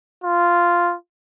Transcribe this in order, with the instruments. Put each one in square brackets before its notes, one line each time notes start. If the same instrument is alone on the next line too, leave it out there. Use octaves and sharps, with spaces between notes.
[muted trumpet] F4